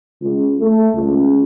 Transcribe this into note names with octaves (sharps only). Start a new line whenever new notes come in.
C#2
A3
C#2